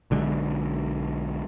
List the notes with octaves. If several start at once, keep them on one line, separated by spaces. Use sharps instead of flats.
B1 D3 G#3